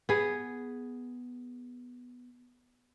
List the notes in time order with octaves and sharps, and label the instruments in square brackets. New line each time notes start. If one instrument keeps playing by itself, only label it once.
[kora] B3 G#4